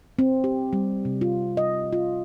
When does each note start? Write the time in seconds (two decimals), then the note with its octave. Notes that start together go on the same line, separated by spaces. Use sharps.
0.19 C4
0.44 G4
0.73 G3
1.05 C3
1.21 F4
1.57 D#5
1.93 F4